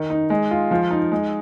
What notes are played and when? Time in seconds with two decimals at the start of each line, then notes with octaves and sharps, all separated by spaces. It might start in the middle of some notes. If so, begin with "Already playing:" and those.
Already playing: D#3
0.10 D#4
0.30 G#3
0.51 F4
0.71 F3
0.91 D#4
1.12 G#3